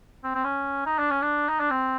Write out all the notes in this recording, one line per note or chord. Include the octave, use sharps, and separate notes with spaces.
C4
C4
C#4
D#4
D4
C#4
D4
D#4
D4
C4